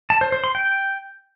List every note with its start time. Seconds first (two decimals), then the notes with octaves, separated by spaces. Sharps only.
0.10 A5
0.21 C5
0.32 C5
0.44 C6
0.55 G5